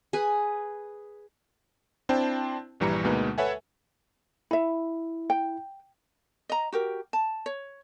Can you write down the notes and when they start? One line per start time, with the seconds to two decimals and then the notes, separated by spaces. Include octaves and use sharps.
0.13 G#4 B4
2.09 C4 D4 E4 C5 G5 A5
2.80 A#1 G2 E3 G3 A#5 C#7
3.04 D2 B2 G#3 A#3 D#4 B4
3.38 A4 B4 C#5 E5 F#5 G#5
4.51 E4 E5 B5
5.30 G5
6.49 D#5 A#5
6.72 F#4 G4 A#4
7.13 A5
7.46 C#5